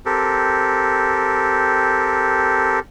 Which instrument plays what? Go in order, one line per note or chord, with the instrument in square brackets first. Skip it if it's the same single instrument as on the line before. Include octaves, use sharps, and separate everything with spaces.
[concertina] C4 G4 A4 A#4